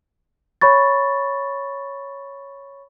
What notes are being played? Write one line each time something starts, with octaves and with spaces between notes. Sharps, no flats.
C#5 B5 C#6 A6